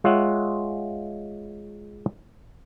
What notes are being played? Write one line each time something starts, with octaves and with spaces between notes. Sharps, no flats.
G#3 F4 C#5 E5 F#5